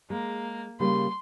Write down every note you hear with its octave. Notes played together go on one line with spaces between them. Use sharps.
G#3 A#3
C#3 G3 A#3 C6